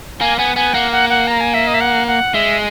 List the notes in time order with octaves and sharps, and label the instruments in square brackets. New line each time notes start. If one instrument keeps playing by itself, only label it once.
[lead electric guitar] A#3 [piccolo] G#5
[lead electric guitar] B3 [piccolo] G#5
[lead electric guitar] B3 [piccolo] G#5
[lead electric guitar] A#3 [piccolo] F#5
[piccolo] F#5
F#5
A#5
G#5
E5
D#5
E5
F#5
F#5
[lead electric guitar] G#3 [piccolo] E5